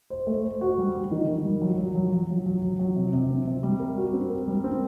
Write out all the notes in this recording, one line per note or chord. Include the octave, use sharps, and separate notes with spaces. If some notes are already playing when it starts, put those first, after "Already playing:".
C5
A3
C5
F#4
G3
G3
D#3
D#3
G3
F#3
F#3
F#3
F#3
F#3
F#3
F#3
F#3
C3
C3
C4
C3
G3
A#4
F#4
C4
A#4
G3
C4